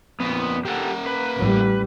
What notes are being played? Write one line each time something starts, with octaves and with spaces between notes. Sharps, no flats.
F2 A#2 B3
A#3 G4 A4 F#5
B4
A1 G3